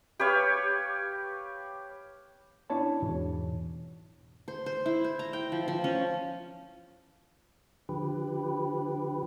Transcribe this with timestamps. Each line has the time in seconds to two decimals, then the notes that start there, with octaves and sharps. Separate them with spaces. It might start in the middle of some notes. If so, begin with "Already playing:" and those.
0.20 G4 B4 C#5 F5
2.70 B3 C#4 D4 E4 C#5 A5
3.02 E2 G#2 B2 E3
4.48 C5
4.66 C5
4.86 E4
5.04 C5
5.19 A#5
5.33 G5
5.52 F3
5.68 F3
5.84 C#4
7.89 D3 F3 G4 B4